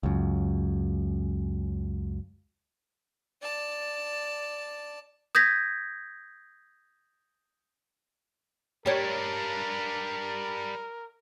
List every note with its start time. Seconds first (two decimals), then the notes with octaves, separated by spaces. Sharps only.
0.03 C#2 F#2
3.41 D5 A5
5.35 D#6 G6 G#6 A#6 B6
8.86 G3 D4 G4 A#4 C#5